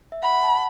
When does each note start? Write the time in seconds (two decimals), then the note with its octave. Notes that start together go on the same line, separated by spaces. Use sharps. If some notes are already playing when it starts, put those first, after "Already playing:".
0.12 E5
0.22 F#5 B5
0.33 F#5
0.43 A5